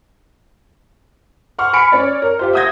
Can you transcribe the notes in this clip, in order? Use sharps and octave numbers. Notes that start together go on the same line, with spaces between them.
F#5 C6 C#6 F6
G#5 B5 C#7 D7
C#4 C#5 D5
A#4
F4 G4 C5
E5 F#5 D#6 G6 G#6 A#6